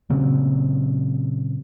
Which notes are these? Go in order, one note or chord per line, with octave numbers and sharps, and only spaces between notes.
A#2 C#3 F#3 C4